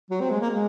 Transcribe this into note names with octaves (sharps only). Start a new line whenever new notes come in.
F#3
C4
G#3
A#3
G#3